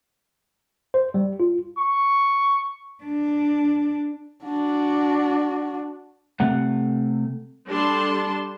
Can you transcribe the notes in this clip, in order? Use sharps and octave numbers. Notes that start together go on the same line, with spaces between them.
C5
G3
F4
C#6
D4
D4 F#4
C3 A3 F#5
G3 D4 A4 A5 C6